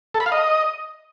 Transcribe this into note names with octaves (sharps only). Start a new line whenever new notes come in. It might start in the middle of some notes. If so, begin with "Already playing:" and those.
A4
B5
F5
D#5